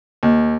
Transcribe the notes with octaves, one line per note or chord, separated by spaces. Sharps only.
D#2